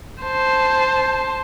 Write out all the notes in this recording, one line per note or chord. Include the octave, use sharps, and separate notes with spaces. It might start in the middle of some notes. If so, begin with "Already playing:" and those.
C5 A5